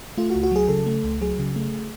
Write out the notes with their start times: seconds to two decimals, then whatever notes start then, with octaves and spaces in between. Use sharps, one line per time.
0.17 A3 F4
0.30 F#4
0.35 C#2
0.43 F#4
0.52 F#3 G#4
0.69 C#3 A4
0.87 A3
1.04 C#2
1.21 F#3 G#4
1.39 C#3
1.56 A3